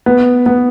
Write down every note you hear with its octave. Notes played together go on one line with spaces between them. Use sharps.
B3
B3